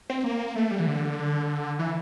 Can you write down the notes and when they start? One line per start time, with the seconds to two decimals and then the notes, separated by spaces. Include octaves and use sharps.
0.10 C4
0.24 A#3
0.56 A3
0.71 G3
0.79 E3
0.87 D3
1.79 E3